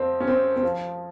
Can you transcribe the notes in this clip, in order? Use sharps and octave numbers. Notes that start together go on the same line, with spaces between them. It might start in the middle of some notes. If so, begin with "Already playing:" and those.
Already playing: F2 C4
C#4
C4
C4
F3